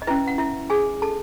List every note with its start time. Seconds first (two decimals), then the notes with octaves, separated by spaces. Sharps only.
0.02 D#5
0.07 C#4 E4 B4 E5
0.27 F#5
0.38 E4 E5
0.70 G#4 G#5
1.02 A4 A5